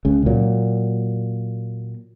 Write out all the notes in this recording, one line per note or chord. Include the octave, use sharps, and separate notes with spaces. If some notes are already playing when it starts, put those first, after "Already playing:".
C#2 C#3
A#2 F#3